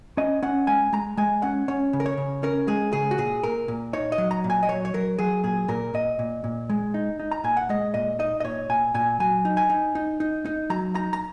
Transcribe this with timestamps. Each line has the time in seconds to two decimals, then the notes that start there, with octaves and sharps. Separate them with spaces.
0.17 C#4 D#5
0.43 C#4 F#5
0.67 G#3 G#5
0.93 G#3 A#5
1.17 G#3 G#5
1.42 C#4 F#5
1.68 C#4 C#5
1.93 C#3
2.00 A#4
2.06 C#5
2.18 C#3
2.43 C#4 A#4
2.68 G#3 G#4
2.93 C#3 G#4
3.11 F#4
3.18 A#2 G#4
3.43 A#2 A#4
3.68 A#2
3.93 D#4 C#5
4.12 D#5
4.18 F#3
4.31 A#5
4.44 A#2
4.50 G#5
4.63 D#5
4.69 F#3 C#5
4.85 C#5
4.94 F#3 A#4
5.19 F#3 G#4
5.44 A#2 G#4
5.68 A#2 A#4
5.94 A#2 D#5
6.19 A#2
6.44 A#2
6.70 G#3
6.94 D#4
7.19 D#4
7.31 A#5
7.44 A#2 G#5
7.57 F#5
7.69 G#3 D#5
7.94 A#2 D#5
8.19 D#4 D#5
8.40 D#5
8.44 A#2 C#5
8.70 A#2 G#5
8.94 A#2 G#5
9.20 F#3 G#5
9.45 D#4
9.57 G#5
9.70 D#4
9.95 D#4
10.20 D#4
10.45 D#4
10.70 F#3 A#5
10.95 D#4 A#5
11.13 A#5